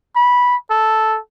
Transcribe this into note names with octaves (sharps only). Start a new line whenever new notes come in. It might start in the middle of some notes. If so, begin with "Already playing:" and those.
B5
A4